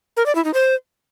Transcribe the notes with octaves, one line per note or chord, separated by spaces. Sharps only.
A#4
D5
E4
D#4
C5